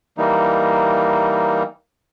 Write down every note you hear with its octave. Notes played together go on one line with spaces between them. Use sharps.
E3 G3 A#3 D#4